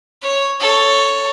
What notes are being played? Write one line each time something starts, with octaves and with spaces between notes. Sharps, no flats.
C#5
A4 C#5